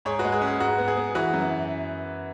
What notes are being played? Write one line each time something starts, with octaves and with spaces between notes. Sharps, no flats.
G#2 G#4 C#5
F#4 B4
G#3
G#4
C#4
G#4
G#2 F#4
B3
G#4
B3
E3 F#4 B4
F#2